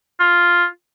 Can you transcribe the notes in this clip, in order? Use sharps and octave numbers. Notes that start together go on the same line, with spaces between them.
F4